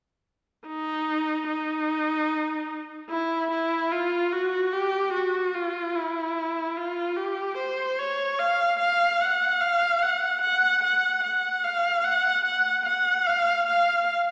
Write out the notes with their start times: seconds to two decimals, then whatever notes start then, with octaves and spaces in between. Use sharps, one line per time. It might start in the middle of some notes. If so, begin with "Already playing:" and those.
0.67 D#4
1.48 D#4
3.10 E4
3.51 E4
3.92 F4
4.32 F#4
4.73 G4
5.14 F#4
5.54 F4
5.95 E4
6.77 F4
7.17 G4
7.58 C5
7.99 C#5
8.40 F5
8.80 F5
9.21 F#5
9.61 F5
10.03 F#5
10.42 F#5
10.84 F#5
11.23 F#5
11.64 F5
12.05 F#5
12.45 F#5
12.86 F#5
13.27 F5
13.67 F5